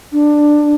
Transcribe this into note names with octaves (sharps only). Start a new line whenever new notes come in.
D4